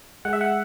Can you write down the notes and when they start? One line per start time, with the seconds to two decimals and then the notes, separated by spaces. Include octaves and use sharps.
0.25 G#3 F#5
0.33 E5
0.41 F#5